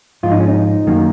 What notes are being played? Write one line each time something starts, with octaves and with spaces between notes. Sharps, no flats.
G#2 F3 G#3 F4
D#4
C#4
D#4
F#2 D#3 F#3 A#3